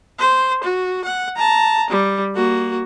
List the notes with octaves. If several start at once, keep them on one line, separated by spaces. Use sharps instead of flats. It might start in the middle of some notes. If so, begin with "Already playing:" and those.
C5
F#4
F#5
A5 A#5
G3
A#3 F#4